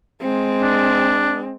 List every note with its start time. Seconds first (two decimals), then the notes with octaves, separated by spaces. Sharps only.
0.22 G#3 C4
0.62 D4